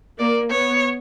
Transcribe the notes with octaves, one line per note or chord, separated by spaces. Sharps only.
A#3 D5
B3 C#5